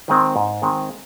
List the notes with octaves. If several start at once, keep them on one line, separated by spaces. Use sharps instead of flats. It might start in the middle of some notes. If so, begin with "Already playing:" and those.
D#3 G#3 C4
G#2
D#3 G#3 C4